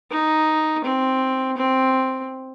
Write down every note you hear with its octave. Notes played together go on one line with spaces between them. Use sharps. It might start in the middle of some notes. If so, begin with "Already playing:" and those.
D#4
C4
C4